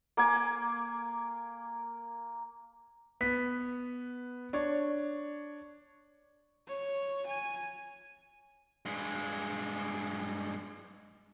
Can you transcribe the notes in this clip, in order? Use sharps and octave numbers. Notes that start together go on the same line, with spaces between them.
A#3 G#5 D6
B3 B6
D4 C#5
C#5
G#5
G2 G#3